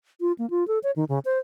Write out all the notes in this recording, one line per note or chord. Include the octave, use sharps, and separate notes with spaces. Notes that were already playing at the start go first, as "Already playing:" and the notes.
F4
A#3
F4
A4
C#5
D#3
C#3
C5